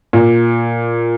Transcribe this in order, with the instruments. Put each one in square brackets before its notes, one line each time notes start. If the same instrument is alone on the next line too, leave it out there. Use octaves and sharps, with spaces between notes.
[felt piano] A#2